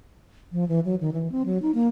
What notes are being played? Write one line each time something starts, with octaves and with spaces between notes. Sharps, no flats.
F3
E3
F#3
D#3
E3
C4
F#3
D#4
A#3